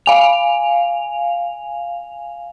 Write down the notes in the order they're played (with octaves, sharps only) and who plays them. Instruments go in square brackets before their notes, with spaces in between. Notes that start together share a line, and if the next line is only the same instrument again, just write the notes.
[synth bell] F5 G#5 F7